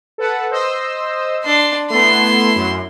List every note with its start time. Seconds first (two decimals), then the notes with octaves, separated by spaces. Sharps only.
0.18 A4 B4 F#5
0.51 C5 D#5 E6
1.44 D4 C6
1.90 A3 B3 E4 C6
2.56 F#2